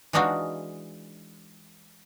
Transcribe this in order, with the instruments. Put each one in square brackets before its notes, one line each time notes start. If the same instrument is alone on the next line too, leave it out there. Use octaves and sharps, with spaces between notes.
[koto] E3 G#3 D4 D#4 F4 F#4